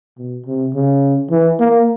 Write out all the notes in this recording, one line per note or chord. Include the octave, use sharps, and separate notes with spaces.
B2
C3
C#3
E3
A#3